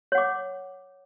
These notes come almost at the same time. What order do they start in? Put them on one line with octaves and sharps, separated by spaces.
C#5 F#5 D6